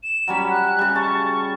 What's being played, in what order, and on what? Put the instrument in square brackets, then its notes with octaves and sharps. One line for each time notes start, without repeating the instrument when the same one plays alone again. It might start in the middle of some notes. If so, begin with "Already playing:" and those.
[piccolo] E7
[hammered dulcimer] F#3 G3 C#4
[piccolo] F#6
[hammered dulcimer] C#3 G3
[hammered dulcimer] A5 [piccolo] C#6